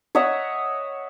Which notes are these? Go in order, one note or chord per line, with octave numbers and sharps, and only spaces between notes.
C#5 D#5 E5 F#5